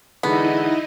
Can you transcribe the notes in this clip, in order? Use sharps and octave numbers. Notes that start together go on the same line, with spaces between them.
D3 E3 G#3 B3 D#4 E4 D#5